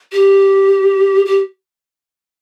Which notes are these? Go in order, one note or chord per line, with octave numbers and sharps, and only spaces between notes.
G4
G4